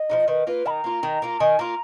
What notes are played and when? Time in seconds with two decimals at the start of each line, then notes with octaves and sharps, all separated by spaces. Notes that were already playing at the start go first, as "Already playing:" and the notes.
Already playing: D#5
0.10 F3 G#3 D#4
0.28 D#3 B4
0.47 A#3 F4 B4
0.66 D#3 B5
0.70 A#5
0.84 A#3 F4
1.03 D#3
1.22 A#3 F4
1.40 D#3 G#5
1.59 A#3 F4 A#5